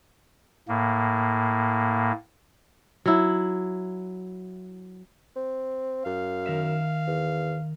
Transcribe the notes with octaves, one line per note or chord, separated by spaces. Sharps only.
A2 A#3
F#3 E4
C4
F#2 F5
D#3 A#4 E5
E2